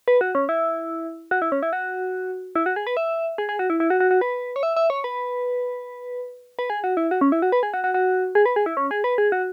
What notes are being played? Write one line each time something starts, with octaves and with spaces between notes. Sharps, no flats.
B4
F#4
C#4
E4
F#4
E4
C#4
E4
F#4
E4
F#4
G#4
B4
E5
G#4
G#4
F#4
E4
E4
F#4
F#4
F#4
B4
C#5
E5
E5
C#5
B4
B4
G#4
F#4
E4
F#4
C#4
E4
F#4
B4
G#4
F#4
F#4
F#4
G#4
B4
G#4
E4
C#4
G#4
B4
G#4
F#4